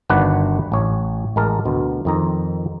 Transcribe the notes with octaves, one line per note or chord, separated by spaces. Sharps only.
G1 D#3 D4 F#4 B4 F#5
A1 C#5
A1 G#3 A#4 A5
D2 B2
F2 D#3 A#5